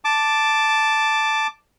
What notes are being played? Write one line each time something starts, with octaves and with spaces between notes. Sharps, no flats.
A5 D6